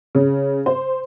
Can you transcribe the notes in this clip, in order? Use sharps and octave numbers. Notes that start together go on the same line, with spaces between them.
C#3
C5